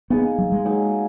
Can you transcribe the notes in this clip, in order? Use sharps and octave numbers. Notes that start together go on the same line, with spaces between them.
A#3 B3 D#4 G#4
F#3
G#3
F#3 A#3 D#4 G#4